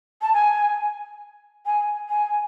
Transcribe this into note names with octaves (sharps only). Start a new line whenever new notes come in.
A5
G#5
G#5
G#5